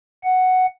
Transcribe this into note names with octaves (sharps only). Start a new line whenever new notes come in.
F#5